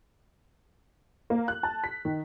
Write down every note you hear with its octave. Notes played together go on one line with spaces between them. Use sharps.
A#3
F#6
A5
B6
D#3